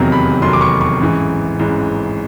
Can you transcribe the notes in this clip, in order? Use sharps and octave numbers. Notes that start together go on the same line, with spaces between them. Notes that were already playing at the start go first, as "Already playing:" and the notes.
Already playing: F1 E2 C3 D#3 F#3 A#5
B5
F1 E2 C3 D#3 F#3 C6
D6
C#6
C#6
A1 G#2 E3
A1 G#2 E3